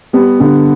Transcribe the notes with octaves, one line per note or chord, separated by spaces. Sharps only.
G3 B3
D3